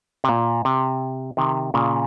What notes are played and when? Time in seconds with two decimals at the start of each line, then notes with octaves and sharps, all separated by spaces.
0.24 C3
0.29 A#2
0.65 C3
1.37 C3 D#3
1.74 A#2 C#3